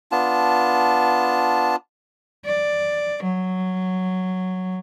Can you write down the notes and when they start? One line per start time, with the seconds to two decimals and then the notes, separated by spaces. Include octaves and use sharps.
0.12 B3 D4 F4 A5
2.45 D5
3.23 F#3